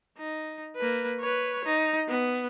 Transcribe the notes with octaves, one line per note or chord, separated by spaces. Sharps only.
D#4
A#3 B4
B4 C#5
D#4
B3